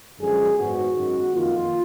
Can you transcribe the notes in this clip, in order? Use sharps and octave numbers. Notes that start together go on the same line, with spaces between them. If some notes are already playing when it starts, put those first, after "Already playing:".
F#2 D3 F3 G#3 G#4
G#2 D#3 F#3 B3 F#4
F#2 D#3 G#3
F2 D#3 A#3 F4